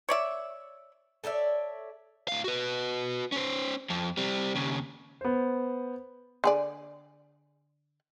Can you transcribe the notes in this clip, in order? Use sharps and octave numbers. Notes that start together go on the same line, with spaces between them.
C#5 D5 E5
A4 C#5 D5 E5
A2 F5
F#4 B4
C#4 C5
F2 F3
G3 C4
D#2 C#3
B3 C5
D3 G#4 D5